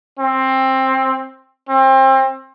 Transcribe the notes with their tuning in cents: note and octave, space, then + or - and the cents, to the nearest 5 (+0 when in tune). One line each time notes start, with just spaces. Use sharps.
C4 +15
C4 +30